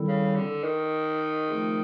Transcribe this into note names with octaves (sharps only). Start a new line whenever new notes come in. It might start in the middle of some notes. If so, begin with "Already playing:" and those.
Already playing: D#3 G3 C4 E4 A4
C#3
D3
D#3
F3 A3 C4 F4 G#4